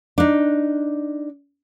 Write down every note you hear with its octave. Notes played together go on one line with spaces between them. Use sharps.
D4 D#4